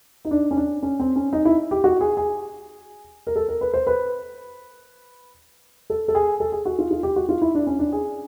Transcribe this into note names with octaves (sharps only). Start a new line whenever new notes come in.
D#4
D4
C#4
D4
C#4
C4
C#4
D#4
E4
G4
F#4
G#4
G#4
A#4
A4
A#4
B4
C5
B4
A4
A4
G#4
A4
G#4
F#4
F4
F4
G4
F#4
F4
E4
D4
C#4
D4
G#4